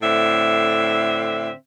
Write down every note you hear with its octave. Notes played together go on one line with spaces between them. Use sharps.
A2 D3 C4 E5